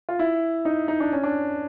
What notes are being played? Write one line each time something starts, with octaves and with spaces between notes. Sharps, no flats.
F4
E4
D#4
D#4
D4
C#4
D4